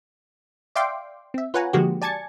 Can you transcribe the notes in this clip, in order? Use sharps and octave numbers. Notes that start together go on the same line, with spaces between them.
D5 E5 F5 G5 C6 D6
C4 E5
F4 B4 C#5 F#5 G#5 A#5
D3 F3 G#3 A#3 F#4 G4
D5 G#5 A5 G#6 A6 C#7